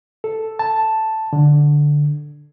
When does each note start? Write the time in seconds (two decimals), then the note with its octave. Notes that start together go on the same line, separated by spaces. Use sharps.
0.24 A4
0.59 A5
1.33 D3